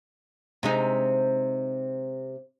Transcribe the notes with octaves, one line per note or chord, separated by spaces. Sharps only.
C3 G#3 D#4